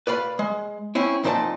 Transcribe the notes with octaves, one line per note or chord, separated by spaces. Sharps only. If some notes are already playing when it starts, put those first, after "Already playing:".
B4 D5 F5 B5
G#3
C4 C#4 E4
F2 A#2 D#4 C5 D5 A5